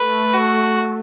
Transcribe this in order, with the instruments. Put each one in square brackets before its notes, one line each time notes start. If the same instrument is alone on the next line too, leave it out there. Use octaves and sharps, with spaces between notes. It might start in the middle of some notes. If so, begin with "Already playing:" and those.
Already playing: [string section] A3 [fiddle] B4
[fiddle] F#4